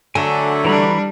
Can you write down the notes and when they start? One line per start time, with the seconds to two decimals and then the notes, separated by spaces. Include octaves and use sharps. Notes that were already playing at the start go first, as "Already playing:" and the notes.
0.15 D3 F#3 A3 G#5 A5
0.65 E3 G3 D4 A#5 B5